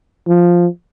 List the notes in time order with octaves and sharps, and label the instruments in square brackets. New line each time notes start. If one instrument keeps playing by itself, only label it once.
[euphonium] F3